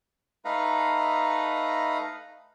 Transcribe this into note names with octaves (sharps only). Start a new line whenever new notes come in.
A3 D#4 B4 F5 A#5